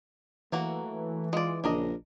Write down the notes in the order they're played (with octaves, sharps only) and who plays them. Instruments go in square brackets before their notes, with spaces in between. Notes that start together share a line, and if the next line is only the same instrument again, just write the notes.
[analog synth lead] E3 [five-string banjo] F#3 A#3 F#4 [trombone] A3
[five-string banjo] G#3 D5 [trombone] F4
[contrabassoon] A#1 [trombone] C#3 [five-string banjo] D4 A#4 D#5